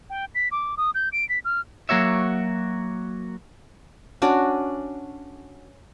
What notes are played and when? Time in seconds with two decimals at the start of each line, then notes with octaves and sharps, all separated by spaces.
0.10 G5
0.35 B6
0.52 D6
0.77 D#6
0.95 G6
1.12 D7
1.29 B6
1.45 F6
1.89 F#3 A#3 F#4 C#5 E5
4.22 C#4 D4 F#4 D5